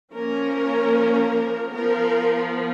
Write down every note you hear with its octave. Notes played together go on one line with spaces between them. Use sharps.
F3 A#3 C#4 A#4
F3 B3 A#4